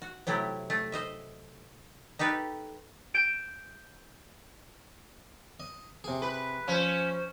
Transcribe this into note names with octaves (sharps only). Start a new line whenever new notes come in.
F#4
C3 F#3 A3 E4 G4
A3
C5 D#5 E5
D#4 G4 A4 B4
G6 D7 E7
D#5
C3 G#4
B4
F3 C#4 C5